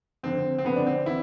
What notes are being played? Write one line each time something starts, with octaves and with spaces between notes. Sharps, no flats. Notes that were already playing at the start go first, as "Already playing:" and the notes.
F2 D3 C4
C4
F2 D3 B3
D4
C4
E3 E4